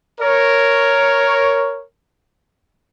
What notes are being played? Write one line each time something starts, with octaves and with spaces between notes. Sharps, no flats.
A#4 C#5